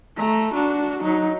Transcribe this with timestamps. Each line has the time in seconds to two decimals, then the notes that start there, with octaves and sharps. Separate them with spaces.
0.17 A3 A#5
0.53 D4 F#4
1.02 F#3 D#4